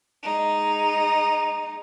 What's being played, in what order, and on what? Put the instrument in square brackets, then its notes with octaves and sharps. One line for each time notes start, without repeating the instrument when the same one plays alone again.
[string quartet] G#3 D#4